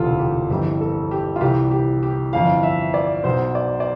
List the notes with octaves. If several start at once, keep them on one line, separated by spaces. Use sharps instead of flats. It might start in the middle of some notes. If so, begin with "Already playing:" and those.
Already playing: E1 D2 C3 E3 F4 A4
G4
G1 F2 E3 G4
A4
G4
F4
C2 C3 E3 G4
G4
G4
G1 F2 E3 F5
E5
D5
B1 B2 C5
D5
D5